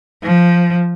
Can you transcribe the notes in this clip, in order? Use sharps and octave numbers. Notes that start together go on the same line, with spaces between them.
F3